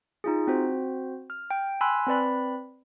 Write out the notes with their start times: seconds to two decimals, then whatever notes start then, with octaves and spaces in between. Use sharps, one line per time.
0.24 D#4 F4 G#4
0.47 C4 F#4 C5
1.30 F6
1.51 G5
1.81 G#5 B5 C6 E6 F#6
2.07 C4 B4 D5 B5